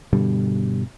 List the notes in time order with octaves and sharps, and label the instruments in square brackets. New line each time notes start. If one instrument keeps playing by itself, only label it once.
[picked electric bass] G2 B2 D3 G3